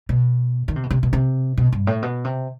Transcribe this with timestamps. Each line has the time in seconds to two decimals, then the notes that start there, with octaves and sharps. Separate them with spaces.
0.09 B2
0.68 D#3
0.76 C3
0.83 B2
0.91 C3
1.03 B2
1.13 C3
1.57 B2
1.73 G2
1.87 A2
2.03 B2
2.24 C3